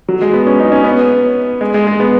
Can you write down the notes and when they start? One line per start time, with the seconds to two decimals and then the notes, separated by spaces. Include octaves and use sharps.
0.09 F#3
0.22 G#3
0.33 B3
0.47 C#4
0.60 D#4
0.72 C#4
0.84 B3
1.61 G#3
1.74 G#3
1.87 G#3
2.00 B3